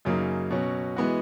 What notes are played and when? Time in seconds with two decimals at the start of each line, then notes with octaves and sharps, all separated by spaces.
0.05 F#2 C#3 F#3 A#3 D#4
0.51 B2 F#3 C#4
0.96 E3 G#3 B3 F#4